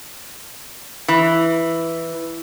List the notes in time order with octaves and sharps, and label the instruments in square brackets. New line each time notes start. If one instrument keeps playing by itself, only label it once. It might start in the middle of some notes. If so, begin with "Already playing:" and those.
[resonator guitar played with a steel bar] E3